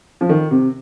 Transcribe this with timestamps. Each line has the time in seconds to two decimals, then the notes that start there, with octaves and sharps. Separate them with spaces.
0.21 F3
0.29 D#3
0.51 C3